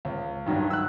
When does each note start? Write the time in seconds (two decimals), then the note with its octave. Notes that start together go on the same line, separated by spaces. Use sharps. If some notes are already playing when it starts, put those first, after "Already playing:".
0.05 C#2
0.46 G2 D#3 F#3 D4
0.70 E6 F#6